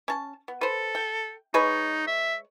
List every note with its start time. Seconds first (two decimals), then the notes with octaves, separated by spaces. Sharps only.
0.08 C#4 A5
0.48 B3
0.61 A4 B4 C5
0.95 G5
1.54 G#3 D#4 B4 C#5
2.07 E5